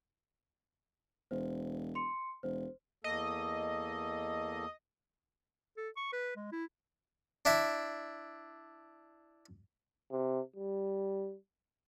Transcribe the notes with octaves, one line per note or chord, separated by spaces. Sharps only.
E1 C5
C6 C#7
E1 C5
E2 A#3 A4 D#5
A4
C#6
B4
G#3
E4
D4 E4 E5
C3
G3